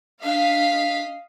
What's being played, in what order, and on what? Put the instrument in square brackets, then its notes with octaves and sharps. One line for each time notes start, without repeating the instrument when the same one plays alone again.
[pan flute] D4 [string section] D#5 F5 B6